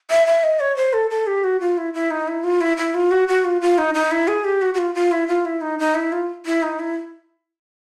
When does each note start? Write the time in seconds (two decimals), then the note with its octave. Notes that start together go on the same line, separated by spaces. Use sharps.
0.10 E5
0.27 E5
0.43 D#5
0.60 C#5
0.76 C5
0.93 A4
1.10 A4
1.27 G4
1.44 F#4
1.60 F4
1.78 E4
1.94 E4
2.11 D#4
2.28 E4
2.44 F4
2.61 E4
2.77 E4
2.94 F4
3.11 F#4
3.28 F#4
3.45 F4
3.61 F4
3.78 D#4
3.94 D#4
4.11 E4
4.28 G#4
4.44 G4
4.62 F#4
4.74 F#4
4.78 F4
4.95 F4
5.12 E4
5.28 F4
5.45 E4
5.61 D#4
5.79 D#4
5.95 E4
6.12 F4
6.46 E4
6.62 D#4
6.79 E4